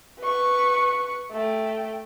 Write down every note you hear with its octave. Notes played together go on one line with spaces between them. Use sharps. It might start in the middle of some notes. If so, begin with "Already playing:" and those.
B4 C#6
A3 G5